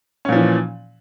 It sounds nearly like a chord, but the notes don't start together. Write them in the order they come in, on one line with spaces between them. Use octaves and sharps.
C#4 A#2 F3 E3